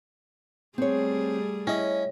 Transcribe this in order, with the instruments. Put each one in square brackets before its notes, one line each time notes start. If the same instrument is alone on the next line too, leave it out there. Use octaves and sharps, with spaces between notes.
[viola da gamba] G3 A3 G#4 [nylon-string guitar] C4 C#5
[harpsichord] C#4 D#5 [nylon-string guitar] E4 [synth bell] C#5